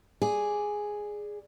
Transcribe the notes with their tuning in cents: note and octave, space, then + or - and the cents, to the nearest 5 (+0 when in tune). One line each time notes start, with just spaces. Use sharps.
G#4 +0 D5 +0